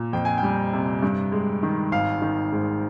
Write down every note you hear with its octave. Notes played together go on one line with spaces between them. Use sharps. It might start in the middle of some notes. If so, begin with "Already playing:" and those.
Already playing: A#2
F2 G5
G#5
G5
G3
C3
G2
G#3
D#3
G#1 F5
D#3
G#2